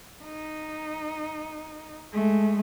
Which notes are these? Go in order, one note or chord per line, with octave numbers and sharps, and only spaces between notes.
D#4
G#3 A3